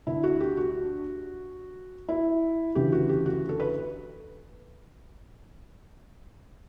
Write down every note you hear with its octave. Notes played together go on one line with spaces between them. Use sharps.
D2 D3 E4
F#4
G4
F#4
E4
D2 C#3 E3 G4
F#4
G4
F#4
A4
B4